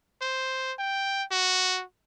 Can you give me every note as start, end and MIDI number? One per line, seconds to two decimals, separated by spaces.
0.22 0.73 72
0.79 1.23 79
1.31 1.83 66